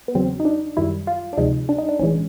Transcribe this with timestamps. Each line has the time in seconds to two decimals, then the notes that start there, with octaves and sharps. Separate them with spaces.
0.08 B3
0.14 E2 C#3 F#3 C4
0.40 D#4
0.45 D4
0.77 F#2 D#3 G3 E4
1.07 F4
1.33 D4
1.37 D2 C3 F3 G#3 D#4
1.69 D4
1.78 D#4
1.89 D4
1.99 B1 A2 E3 G#3 C#4